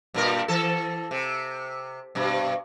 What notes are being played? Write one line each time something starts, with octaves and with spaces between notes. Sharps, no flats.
G2 A#2 A#4
E3 A4
C3
G2 B2